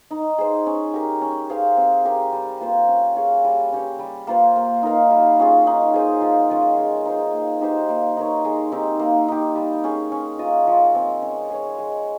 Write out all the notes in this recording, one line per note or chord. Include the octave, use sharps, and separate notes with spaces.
D#4
G#4 C5
C#4
G4 A#4
C#4
G#4 C5 F5
C4
G4 A#4
G3
A#3 F4 C5
C#4
G#4 C#5 F5
G3
C#4 G4 C#5
G3
A#3 F4 C5
A#3
D#4 A#4 F5
G3
C#4 F4 G#4
D#4
G#4 C5 D#5
F3
G#3 C#4 F4
G#3
D#4 G#4 C5
A#3
D#4 G4 C5
A#3
D#4 A#4 C#5
G#3
C4 D#4 G4
A#3
D#4 G4
G3
C#4 G#4
C#4
F4 A#4 D#5
F3
G#3 C4
C#4
G#4 C#5
G#3